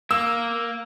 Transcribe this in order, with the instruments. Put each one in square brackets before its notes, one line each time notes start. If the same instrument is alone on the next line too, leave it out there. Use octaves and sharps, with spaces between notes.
[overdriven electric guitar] A#3 [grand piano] E6